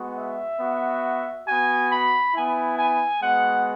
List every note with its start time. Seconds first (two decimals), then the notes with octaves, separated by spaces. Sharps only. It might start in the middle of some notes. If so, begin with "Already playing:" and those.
Already playing: G#3 B3 F#4
0.17 E5
0.60 B3 F#4
1.47 B3 F#4 G#5
1.91 B5
2.35 B3 E4 G#5
2.78 G#5
3.21 G#3 B3 F#4 F#5